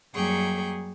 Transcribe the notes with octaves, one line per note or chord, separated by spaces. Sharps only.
F#2 G3 A#3 G#4 G5 C#6